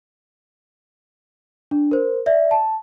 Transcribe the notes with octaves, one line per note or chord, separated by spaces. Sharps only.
D4
A#4 C5
D5 E5
A5